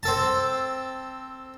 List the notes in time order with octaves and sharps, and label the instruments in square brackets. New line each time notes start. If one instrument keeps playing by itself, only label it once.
[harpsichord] C4 A4 A5